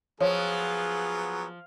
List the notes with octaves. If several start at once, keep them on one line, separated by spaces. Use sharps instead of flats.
F3 F#3 B3 F4 G#4 C#5